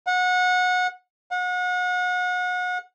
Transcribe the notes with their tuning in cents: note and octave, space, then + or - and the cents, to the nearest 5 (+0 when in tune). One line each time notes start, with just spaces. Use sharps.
F#5 -25
F#5 -35